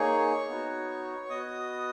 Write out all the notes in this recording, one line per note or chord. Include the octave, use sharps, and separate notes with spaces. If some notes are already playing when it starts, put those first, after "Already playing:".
Already playing: A#3 D#4 G#4 C#5 C#6
B3 D#4 F#4
B3 F#4 D#5 D#6